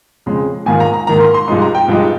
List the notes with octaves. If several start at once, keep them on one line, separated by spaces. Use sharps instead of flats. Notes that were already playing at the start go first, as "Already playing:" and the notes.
F2 C#3 G#3
G#2 D#3 A#3 F4 G#5
A#5
A#5
G#2 D#3 A#3 F4 A#5
C6
C6
G2 F3 G#3 D#4 C6
A#5
G5
G2 F3 G#3 D#4